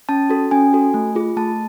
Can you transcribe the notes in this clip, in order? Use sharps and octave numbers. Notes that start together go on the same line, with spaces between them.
C#4 A5
F#4 A4
C#4 G#5
F#4 A4
A3
F4 G#4
A3 A5